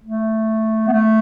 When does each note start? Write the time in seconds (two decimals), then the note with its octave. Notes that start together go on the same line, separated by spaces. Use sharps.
0.04 A3
0.87 B3
0.93 A3